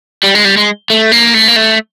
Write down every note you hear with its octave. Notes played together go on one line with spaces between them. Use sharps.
G3
G#3
G3
G#3
A3
A#3
A3
A#3
A3